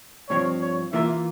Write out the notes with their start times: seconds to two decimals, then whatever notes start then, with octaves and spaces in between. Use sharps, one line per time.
0.29 G2 F3 C4 C#5
0.62 C#5
0.93 E3 A#3 F4 A#4 E5